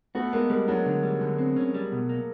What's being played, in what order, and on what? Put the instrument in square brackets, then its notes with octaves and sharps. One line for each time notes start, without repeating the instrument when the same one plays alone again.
[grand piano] A3 B3 [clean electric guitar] F#4
[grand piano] G#3 A#3 [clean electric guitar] B3
[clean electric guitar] G3 [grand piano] G#3 A#3
[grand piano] F#3 G#3 [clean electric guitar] D4
[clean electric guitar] D3
G3
D3
C4
C#4
G3
B2
A#3